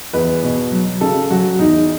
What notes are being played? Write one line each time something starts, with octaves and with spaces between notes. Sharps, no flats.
E2 B4
B2
F#3
C#3 A4
F#3 F#4
E2 D#4